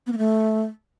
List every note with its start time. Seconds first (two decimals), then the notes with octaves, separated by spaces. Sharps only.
0.07 B3
0.12 A#3
0.18 A3